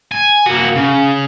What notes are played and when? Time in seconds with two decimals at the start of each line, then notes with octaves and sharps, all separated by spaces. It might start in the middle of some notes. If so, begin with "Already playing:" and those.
0.12 G#5
0.46 A#3 F#4
0.76 C#3